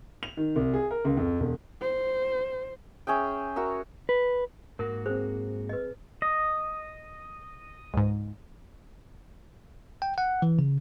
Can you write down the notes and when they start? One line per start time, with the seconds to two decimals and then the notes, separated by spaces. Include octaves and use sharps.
0.23 F7
0.37 D#3
0.56 C2
0.74 G#4
0.91 A#4
1.05 C#2
1.17 F2
1.40 E1
1.82 C5
3.07 C#4 G#4 E5 G5
3.56 F#4 A#4 E5
4.09 B4
4.79 G#2 A#3 F#4 A#4
5.06 C4 G#4 C5
5.69 B4 D#5
6.22 D#5
7.93 C#2 G#2
10.02 G5
10.18 F#5
10.42 E3
10.59 C#3